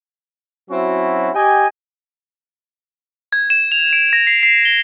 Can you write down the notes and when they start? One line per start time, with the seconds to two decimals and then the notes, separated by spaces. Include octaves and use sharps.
0.70 F#3 C4 C#4 E4 F#4
1.34 G4 D#5 G5 G#5
3.33 G#6
3.50 E7
3.72 F7
3.93 D7
4.13 A#6
4.27 C7
4.43 C7
4.65 G7